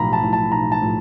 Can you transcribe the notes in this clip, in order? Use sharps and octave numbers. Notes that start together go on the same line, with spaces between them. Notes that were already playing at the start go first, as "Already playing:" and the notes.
Already playing: B1 A2 F3 A#5 B5
A5
A2 F3
A5
B1 A#5
A5
A2 F3